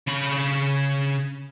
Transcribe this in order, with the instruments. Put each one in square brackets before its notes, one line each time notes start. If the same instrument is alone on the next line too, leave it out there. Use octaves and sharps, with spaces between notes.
[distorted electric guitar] C#3 B5